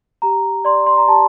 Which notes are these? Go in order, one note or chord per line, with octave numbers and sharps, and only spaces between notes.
G4 A#5
D5 C6
C6
A#5
G4 A5